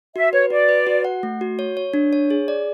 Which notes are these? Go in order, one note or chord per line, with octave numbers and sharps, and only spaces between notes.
F#4 E5
B4 C#5
F#4 D5
B4
F#4
F#5
A3
F#4
C#5
C#5
D4
C#5
G#4
D5